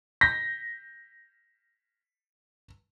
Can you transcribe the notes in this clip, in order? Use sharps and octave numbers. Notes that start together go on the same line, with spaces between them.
G6 A#6 B6